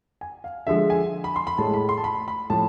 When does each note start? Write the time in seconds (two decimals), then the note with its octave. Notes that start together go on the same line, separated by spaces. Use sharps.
0.21 G#5
0.44 F5
0.67 D3 F3 G#3 E5
0.90 G#5
1.24 B5
1.36 C6
1.47 B5
1.58 A2 G#3 A5
1.74 B5
1.89 C6
1.98 A5
2.04 B5
2.28 B5
2.50 A2 F3 A5